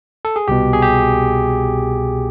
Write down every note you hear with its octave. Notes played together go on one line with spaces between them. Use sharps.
A4
G#4
C2 B2 G4
G#4
G4